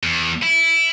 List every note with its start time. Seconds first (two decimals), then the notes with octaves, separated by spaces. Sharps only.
0.03 E2
0.43 E4